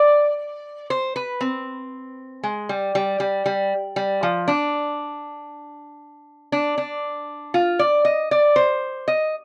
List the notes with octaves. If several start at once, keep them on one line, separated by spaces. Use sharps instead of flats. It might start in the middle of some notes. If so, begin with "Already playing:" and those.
Already playing: D5
C5
B4
C4
G#3
G3
G3
G3
G3
G3
F3
D4
D4
D4
F4
D5
D#5
D5
C5
D#5